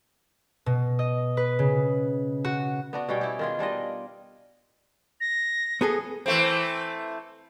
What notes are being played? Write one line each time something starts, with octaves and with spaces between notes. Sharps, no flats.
B2
D#5
B4
C#3
F#4
B3 D4 F#4
B2 G3 C#4 G5
E4 G4
D#3 F4 G#4
G3 D4 F4 D#5
A#6
B3 G#4 A4
E3 A3 C4